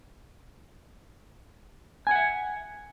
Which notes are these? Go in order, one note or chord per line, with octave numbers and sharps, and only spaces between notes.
E5 F#5 G#5